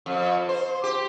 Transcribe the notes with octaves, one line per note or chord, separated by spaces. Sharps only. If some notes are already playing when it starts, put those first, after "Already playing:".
F2
C5
G4